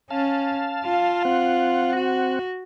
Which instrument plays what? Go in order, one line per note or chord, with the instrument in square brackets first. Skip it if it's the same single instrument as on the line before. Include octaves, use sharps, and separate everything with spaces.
[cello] C#4 [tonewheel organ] F5 A5
[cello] F4
[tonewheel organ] C4 F#5
[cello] F#4